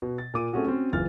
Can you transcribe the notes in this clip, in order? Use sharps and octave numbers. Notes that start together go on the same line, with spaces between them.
B2
A6
A#2 F4 D6 D#7
A3 C4 C#4 F4 F#4 G#4
C4 C#4 F#4
F#1 E3 F4 F6 A6